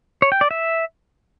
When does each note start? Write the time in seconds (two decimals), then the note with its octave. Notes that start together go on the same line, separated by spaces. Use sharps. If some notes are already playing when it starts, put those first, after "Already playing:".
0.22 C#5
0.32 G5
0.41 D5
0.51 E5